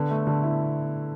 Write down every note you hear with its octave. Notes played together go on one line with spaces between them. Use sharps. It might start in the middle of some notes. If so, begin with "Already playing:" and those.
Already playing: D3 B3
A3
D3
E4